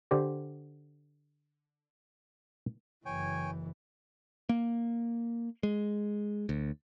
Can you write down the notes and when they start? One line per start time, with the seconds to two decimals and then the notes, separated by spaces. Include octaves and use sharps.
0.11 D3 G4 C5 D5
3.06 F#1 E3 C#5 G5 G#5
4.49 A#3
5.63 G#3
6.49 D2